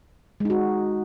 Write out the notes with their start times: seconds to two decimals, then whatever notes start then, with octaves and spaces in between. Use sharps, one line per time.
0.40 G#3
0.45 D#4
0.50 F#4